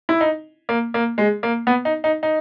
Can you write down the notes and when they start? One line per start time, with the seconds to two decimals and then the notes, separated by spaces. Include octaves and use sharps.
0.09 E4
0.21 D#4
0.69 A#3
0.94 A#3
1.18 G#3
1.43 A#3
1.67 B3
1.85 D#4
2.04 D#4
2.23 D#4